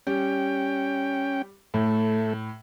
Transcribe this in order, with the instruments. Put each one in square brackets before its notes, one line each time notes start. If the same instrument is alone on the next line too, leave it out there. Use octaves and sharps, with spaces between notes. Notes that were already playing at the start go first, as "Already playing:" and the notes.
[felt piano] G3 [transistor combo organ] C#4 G5
[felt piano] A2 [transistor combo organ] A3